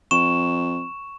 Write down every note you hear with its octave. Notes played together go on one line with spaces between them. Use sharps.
F2 C#6 E7